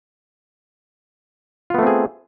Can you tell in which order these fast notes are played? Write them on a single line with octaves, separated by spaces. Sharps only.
F4 B3 A3 C4 G#4